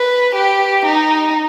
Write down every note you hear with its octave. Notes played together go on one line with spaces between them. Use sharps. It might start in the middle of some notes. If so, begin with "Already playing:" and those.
Already playing: B4
G4
D#4